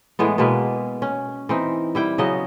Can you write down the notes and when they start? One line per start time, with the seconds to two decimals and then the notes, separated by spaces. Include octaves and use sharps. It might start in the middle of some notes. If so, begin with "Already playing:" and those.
0.19 A2 E3 G#3 B3
0.38 B2 G#3 A#3 B4
1.02 C#4
1.49 E3 C4 D#4
1.95 G3 E4 G5
2.18 C#3 F#3 B3 D#5